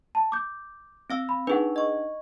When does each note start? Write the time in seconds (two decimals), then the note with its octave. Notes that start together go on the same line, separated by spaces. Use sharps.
0.15 A5
0.32 D6 G6
1.10 C4 F5 E6
1.29 B5
1.47 D4 D#4 G#4 B4 F#5
1.76 D#5 C#6